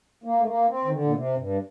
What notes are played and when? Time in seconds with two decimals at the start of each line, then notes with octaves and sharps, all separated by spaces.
0.24 A#3
0.40 A3
0.46 A#3
0.69 C4
0.85 D#3
0.92 D3
1.04 A#2
1.14 C3
1.37 G2